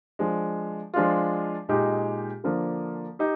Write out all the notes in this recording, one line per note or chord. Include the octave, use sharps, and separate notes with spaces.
F3 G#3 D4
F3 G#3 D4 F4
A#2 G#3 D#4 G4
D3 F3 A#3 D4
D#4 G4